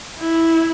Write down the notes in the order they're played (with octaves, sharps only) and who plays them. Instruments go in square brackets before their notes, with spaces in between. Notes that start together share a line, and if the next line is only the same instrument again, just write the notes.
[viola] E4